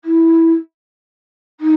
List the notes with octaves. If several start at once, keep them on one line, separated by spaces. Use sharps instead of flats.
E4
D#4